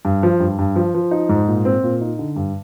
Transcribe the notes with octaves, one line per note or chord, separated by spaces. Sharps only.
G2
F3
G2
G2
F3
F3
D#4
G#2
A#2
C4
A#2
D#4
D3
G2